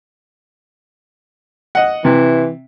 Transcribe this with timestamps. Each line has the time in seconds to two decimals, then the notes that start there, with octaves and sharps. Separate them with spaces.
1.75 D#5 F#5
2.05 C3 E3